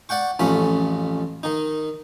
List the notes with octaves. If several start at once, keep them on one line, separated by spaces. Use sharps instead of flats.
D5 F#5 G5 C#6
A1 F2 A3 C#4 B5
D#3 D#4